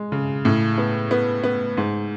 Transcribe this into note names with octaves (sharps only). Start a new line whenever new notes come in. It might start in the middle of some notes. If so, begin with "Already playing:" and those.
Already playing: G#3
C#3
A2
B3
B3
B3
G#2